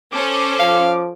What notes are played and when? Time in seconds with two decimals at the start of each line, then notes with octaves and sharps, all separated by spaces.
0.12 C#4 A4 C5 D6
0.60 F3 F5